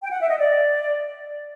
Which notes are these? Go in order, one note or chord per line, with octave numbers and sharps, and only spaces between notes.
G5
F#5
E5
D#5
D5